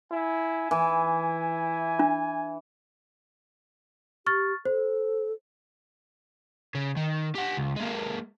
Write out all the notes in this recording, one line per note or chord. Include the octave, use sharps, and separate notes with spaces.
E4 G#5
E3 E4
D4
G4 C#6 F6 A6
A4 C5
C#3
D#3
G4 F#5
C#2
G#3 A#3